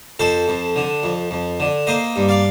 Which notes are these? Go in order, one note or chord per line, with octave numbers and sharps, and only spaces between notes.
F2 A4 C5
F2
D3
F2
F2
D3
A#3 C5 D#5
G2
D5 F5